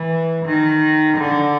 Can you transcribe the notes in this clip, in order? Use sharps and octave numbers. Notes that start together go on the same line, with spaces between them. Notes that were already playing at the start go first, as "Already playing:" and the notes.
Already playing: E3
D#3
D3